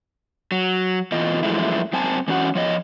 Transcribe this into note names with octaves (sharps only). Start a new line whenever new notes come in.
F#3
B2 E3 F4 D#5
F#2 E3 F3 G#3 A3 E4
F#2 C4 G#5 A5
E3 C#4 F#4 F#5
F3 C#5 D#5